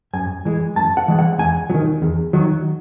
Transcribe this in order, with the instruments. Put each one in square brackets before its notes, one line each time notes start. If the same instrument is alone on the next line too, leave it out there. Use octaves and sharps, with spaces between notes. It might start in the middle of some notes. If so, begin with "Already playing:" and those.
[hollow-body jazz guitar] F#2 G#5
E3 G#3
F#2 A5
F#5
E3 G#3
F#5
E2 G#5
F#3
D#3
E2
D#3 F#3